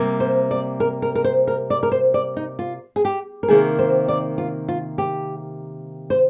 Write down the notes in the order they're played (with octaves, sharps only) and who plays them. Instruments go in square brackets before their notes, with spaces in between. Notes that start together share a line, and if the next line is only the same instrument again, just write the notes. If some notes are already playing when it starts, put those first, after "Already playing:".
Already playing: [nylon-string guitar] C3 G3 A#3
C5
D5
A#4
A#4
A#4
C5
A#4
D5
A#4
C5
D5
D#4
F4
G#4
G4
A#4
C3 D#3 A#3 G#4
C5
D5
F4
F4
G4
C5